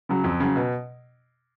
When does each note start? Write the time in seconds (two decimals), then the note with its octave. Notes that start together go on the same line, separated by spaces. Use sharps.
0.09 C#3 F#3
0.24 F2
0.40 C#3 F#3
0.56 B2